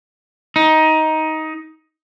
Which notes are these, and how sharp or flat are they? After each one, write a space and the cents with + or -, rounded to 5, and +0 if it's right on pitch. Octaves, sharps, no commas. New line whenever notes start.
D#4 +15